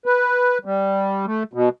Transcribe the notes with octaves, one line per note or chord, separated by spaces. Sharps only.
B4
G3
A3
B2